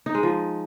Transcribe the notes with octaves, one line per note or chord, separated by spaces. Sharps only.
D#4
G#3
F3